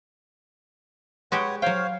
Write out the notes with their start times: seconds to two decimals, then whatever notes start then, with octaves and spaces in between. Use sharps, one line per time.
1.32 G#3 F#4 G4 B4 C#5 F#5
1.62 F#3 C5 C#5 F5 G5